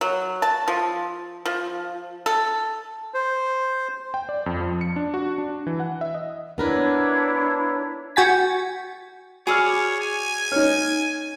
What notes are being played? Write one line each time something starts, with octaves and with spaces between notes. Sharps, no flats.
F#3
A5
F3
F3
A4
C5
G5
D5
F2
F3
C#7
D4
F#4
D4
E3
F#5
E5
D#5
B3 D4 E4 A#4 B4 C#5
F#4 G5 G#5 A6 B6
F#4 G#4 C#5 D5 E6 F6
G#5
D#4 C#5 F6